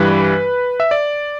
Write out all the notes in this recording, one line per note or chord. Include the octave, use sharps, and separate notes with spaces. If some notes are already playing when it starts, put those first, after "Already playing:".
Already playing: G2 E3 G3 B4
E5
D5